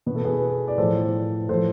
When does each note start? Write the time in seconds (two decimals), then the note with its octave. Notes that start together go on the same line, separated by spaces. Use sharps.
0.06 B2 B4
0.16 A4
0.25 G#4 B4
0.68 D5
0.78 A2 F3 A4 C5
1.49 A2 F3 A4 C5